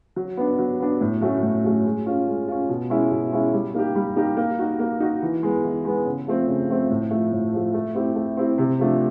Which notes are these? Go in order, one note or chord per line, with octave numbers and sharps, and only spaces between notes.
F#3
B3 D4
F#3
B3 D4
A2
F#3 A3 C#4 F#4
A2
F#3 A3 C#4 F#4
G#3
C#4 F4
G#3
C#4 F4
B2
G#3 C#4 E4
B2
G#3 C#4 E4
G3
A#3 D#4 G4
G3
A#3 D#4 G4
A#3
D#4 F#4
A#3
D#4 F#4
E3
G#3 B3
E3
G#3 B3
C#3
F3 A3 C4
C#3
F3 A3 C4
A2
F3 A3
A2
F3 A3
A3
C4 E4 G4
A3
C4 E4 G4
C3
F3 A3 D4